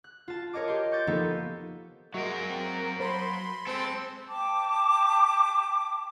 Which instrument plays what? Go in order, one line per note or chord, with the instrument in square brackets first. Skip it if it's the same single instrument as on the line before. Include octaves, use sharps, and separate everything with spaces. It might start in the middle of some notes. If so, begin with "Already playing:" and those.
[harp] F#6
F4 A5
A#4 C#5 D#5 D6
G4 C6
C#6 G6 A6
F3 A#3 B3 D#4 A4
[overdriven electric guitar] F#3 A#4 [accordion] G#3 [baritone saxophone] A#3 [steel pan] F#4 E5 C#6
[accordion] C4
[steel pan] C5 [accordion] B5 C6
[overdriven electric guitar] G#3 A4 [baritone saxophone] C4
[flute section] G5 A5 D6